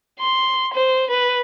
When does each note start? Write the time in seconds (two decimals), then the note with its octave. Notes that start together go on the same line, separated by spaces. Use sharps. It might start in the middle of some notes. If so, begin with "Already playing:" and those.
0.20 C6
0.74 C5
1.11 B4